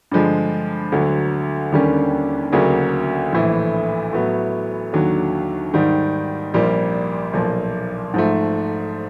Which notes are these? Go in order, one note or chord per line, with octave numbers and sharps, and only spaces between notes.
G2 D3 F3 G#3
D2 D3 F#3
D#2 D3 G3 A#3 C#4
D2 C#3 F#3 A#3 D4
A#1 A2 E3
A2 F#3 B3
D#2 D3 F#3
G#2 D#3 G3
A#1 A#2 G3 A#3
B1 A#2 F3 A#3
G#2 F3 A3